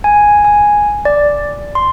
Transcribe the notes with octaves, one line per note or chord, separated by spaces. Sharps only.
G#5
G#5
D5
C6